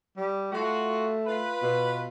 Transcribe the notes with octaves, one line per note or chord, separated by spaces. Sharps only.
G3
A3 F4 F#4
F4 B4
B2